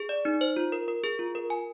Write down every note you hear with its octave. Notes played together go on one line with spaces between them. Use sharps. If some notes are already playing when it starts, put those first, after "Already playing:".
Already playing: G#4
D5
D#4
C5
F4
A#4
A#4
G#4
F4
A#4
G#5